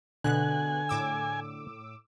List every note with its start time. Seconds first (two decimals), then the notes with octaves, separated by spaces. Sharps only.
0.24 B2 D3 G#5 F#6
0.89 A2 D6 E6